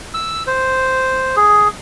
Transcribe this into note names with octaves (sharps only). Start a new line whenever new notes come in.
E6
C5
G#4